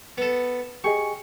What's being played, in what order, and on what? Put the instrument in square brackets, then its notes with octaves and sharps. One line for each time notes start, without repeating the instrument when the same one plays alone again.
[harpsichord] B3 A4
[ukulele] G4 G#4 D#5 [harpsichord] C#6